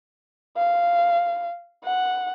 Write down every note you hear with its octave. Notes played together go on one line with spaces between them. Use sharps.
F5
F#5